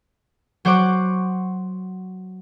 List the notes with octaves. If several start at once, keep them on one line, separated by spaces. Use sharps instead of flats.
F#3 C5 F#5 C#6 D6